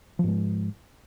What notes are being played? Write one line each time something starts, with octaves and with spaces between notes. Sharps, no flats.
G#2 F3 G#3